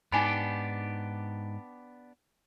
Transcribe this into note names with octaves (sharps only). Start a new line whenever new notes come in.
G#2 B3 D4 D#4 G4 G#5 B5